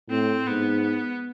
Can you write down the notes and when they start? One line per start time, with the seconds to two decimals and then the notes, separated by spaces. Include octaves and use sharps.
0.10 A2 C4
0.47 G#2 B3